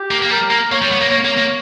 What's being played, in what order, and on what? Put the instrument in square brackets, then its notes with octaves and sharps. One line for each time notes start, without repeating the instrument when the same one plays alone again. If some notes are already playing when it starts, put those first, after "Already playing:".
Already playing: [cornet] G4
[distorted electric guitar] A#3
A#3
[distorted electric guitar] G3 [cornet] A#4
[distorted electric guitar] A#3
[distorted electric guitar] A#3 [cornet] C#5
[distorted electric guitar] G3
B3
A#3
[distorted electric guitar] A#3 [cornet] C#5
[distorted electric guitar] A#3
A#3